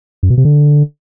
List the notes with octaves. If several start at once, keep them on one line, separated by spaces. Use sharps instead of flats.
F#2
B2
C3
D3